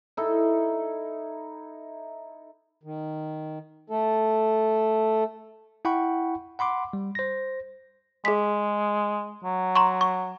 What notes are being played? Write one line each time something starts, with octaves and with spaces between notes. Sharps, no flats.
D#4 E4 A4
D#3
A3 A4
E4 F#5 G5 B5 C#6
F#5 B5 C6 D6
G3
C5 A#6
G#3 G#4 B6
F#3
A#5 C6 C#6
C#6